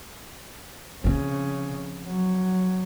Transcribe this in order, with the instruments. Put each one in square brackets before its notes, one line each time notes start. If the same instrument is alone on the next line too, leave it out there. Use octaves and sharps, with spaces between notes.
[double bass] C#3 [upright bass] F3 C4
[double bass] F#3